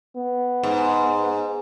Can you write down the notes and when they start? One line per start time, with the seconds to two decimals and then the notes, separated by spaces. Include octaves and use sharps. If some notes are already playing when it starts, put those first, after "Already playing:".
0.16 B3
0.63 G#2